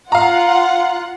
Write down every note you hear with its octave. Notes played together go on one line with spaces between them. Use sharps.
F4 F5 F#5 A#5